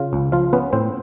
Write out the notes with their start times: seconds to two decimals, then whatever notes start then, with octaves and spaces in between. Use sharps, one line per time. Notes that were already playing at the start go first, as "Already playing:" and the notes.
Already playing: C#3 F4 F5
0.13 C#2
0.32 F3 F4 F5
0.53 B3 C#4 B4
0.73 A2 C4 C5